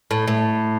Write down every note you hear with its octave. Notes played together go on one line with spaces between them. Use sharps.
A2
A2